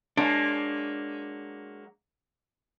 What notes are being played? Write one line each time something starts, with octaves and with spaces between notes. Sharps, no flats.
F#3 G#3 A#3 D4